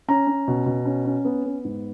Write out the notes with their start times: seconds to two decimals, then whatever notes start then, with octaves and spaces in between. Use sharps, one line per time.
0.08 C#4 A#5
0.27 C#4
0.47 B2
0.66 B2
0.85 C#4
1.05 C#4
1.25 B3
1.45 B3
1.65 G#2